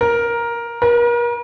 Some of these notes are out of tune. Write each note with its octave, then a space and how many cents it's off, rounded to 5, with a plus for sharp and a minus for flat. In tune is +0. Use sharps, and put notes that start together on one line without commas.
A#4 +10
A#4 +40